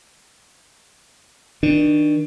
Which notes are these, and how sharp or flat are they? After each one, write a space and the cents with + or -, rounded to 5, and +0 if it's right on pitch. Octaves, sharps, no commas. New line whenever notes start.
D#3 +30 D4 +30